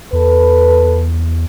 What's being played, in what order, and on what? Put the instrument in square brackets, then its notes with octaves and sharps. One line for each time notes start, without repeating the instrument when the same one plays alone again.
[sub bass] E2 [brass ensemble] A4 B4